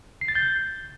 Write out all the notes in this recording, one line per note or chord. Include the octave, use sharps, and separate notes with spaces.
C7
A6
G6